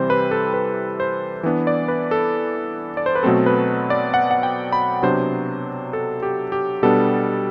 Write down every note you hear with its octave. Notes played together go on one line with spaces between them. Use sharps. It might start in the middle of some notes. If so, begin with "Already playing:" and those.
Already playing: C3 E3 G3 C4 C5
B4
A4
B4
C5
E3 B3 D4
D5
B4
A4
D5
C5
B4
B2 F#3 A3 C4 A4
B4
D5
F#5
F#5
G5
B5
C3 F#3 B3 D4 C5
A4
G4
G4
B2 G3 B3 D4 A4